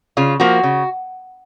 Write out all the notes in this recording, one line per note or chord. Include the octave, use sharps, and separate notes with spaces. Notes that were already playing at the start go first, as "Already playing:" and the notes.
C#3 F4
F3 A#3 F#4
C#3